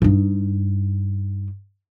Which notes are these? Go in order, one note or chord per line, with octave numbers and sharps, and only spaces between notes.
G2 D#4